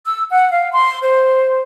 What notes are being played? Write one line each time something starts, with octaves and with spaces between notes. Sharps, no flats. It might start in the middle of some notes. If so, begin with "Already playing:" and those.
E6
F#5
F5
C6
C5